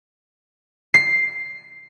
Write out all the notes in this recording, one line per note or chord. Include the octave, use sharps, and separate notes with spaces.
C7